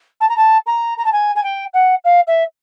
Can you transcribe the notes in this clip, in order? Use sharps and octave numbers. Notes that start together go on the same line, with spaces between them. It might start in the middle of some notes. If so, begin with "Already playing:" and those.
A5
A#5
A5
A#5
A#5
A5
G#5
G#5
G5
F#5
F5
E5